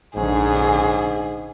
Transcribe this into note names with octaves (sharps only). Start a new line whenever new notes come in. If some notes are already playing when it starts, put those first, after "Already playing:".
A#1 G#2 D3 C#4 G#4